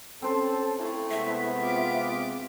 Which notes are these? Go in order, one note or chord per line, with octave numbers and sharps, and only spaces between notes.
C4 C#4 A4 C5
A3 E4
C3 G#3 B3 E5
F4 D6